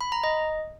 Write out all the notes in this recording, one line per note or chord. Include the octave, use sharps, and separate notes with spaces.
B5
A#5
D#5